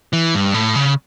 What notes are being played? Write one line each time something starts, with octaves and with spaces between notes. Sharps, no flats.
E3
G2
A2
C#3